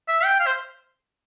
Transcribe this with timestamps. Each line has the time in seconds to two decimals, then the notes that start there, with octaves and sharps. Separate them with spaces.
0.08 E5
0.24 G5
0.40 F5
0.46 C5